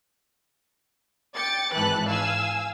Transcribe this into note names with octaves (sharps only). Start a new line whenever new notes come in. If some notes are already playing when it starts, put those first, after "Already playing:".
G5 D6 A6 C#7
G#1 G#2 E3 B4 A5 F#6
F5 G#5 E6